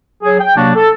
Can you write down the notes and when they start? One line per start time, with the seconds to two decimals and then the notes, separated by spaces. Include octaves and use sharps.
0.23 F#3 G#4
0.40 G5
0.56 C3 F#3 A#3 D4 F#4
0.75 A4